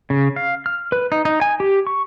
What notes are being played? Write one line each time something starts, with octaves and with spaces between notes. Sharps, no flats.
C#3
F5
F6
B4
D#4
D#4
G#5
G4
C#6